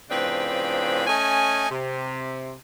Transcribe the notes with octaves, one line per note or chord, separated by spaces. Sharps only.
A2 C#3 F3 C4 D4 B4
A3 C#4 D#5 G#5
C3